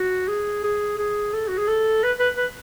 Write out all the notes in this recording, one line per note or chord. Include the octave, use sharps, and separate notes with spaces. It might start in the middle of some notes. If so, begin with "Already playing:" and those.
Already playing: F#4
G#4
G#4
G#4
A4
F#4
G#4
A4
B4
B4
B4